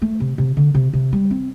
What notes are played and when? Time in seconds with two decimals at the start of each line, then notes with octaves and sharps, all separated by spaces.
0.02 A3
0.20 C3
0.38 C3
0.57 D3
0.75 C3
0.93 C3
1.12 G3
1.31 C4